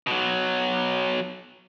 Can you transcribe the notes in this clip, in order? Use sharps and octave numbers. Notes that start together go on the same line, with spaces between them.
B2 F#3